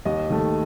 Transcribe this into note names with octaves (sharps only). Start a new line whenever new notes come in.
D#2 D#5
D#3 A3